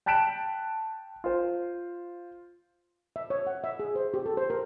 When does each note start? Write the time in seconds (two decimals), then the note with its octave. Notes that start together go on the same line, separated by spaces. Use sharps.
0.06 G5 A5 F#6 B6 D7 E7
1.24 F4 C5
3.16 E5
3.30 C#5
3.47 F#5
3.64 E5
3.79 G#4
3.96 C5
4.14 G4
4.26 A4
4.37 C5
4.50 A#4